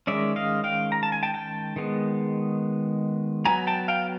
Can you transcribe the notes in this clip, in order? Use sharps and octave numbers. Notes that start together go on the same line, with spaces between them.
D#3 G#3 C#4 D5 E5
D#5 F5
F5 G5
A#5
A5
G#5
G5 A5
G5 A5
D#3 G#3 B3
F#3 B3 G#5 A#5
G5 A5
F5 G5